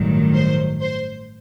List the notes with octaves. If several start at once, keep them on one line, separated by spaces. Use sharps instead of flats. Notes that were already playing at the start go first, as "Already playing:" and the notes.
Already playing: A1 G2 D#3 F#3
C5
C5